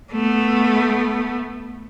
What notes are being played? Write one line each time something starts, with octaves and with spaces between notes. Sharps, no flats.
A3 B3